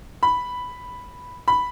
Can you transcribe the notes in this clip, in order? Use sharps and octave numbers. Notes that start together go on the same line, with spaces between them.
B5
B5